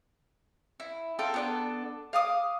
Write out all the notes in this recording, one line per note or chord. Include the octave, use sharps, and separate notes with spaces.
E4
F4 A4 A#4 G5
B3 D4 A4
F5 D6 D#6